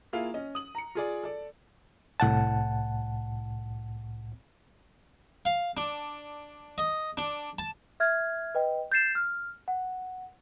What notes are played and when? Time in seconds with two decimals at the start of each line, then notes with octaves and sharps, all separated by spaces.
0.13 A#3 E4 F4 G#4 F5
0.34 C#4 D#5
0.55 D#6 F#7
0.75 A#5 C#7
0.95 F4 G#4 D5
1.23 A4 D5
2.20 C2 A2 F#5 A5
5.45 F5
5.77 D4
6.78 D#5
7.17 D4
7.59 A5
8.00 E5 F6 G#6
8.55 B4 D#5 G5
8.92 G6 A6 C7 E7
9.15 F6
9.68 F#5